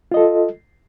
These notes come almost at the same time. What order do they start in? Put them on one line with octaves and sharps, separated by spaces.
F4 D#5 A4